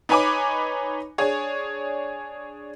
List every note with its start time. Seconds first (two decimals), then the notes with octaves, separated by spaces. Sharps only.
0.09 D#4 B4 C#5 G#5 B5 D6
1.18 D4 G#4 C#5